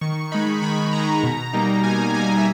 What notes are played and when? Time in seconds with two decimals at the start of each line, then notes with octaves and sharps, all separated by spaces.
0.01 D#3 C#6
0.32 G#3 D#4 B5
0.62 D#3 B5
0.93 G#3 D#4 A#5
1.23 B2
1.53 G3 A#3 D#4
1.84 B2 G#5
2.14 G3 A#3 D#4 G#5
2.38 E5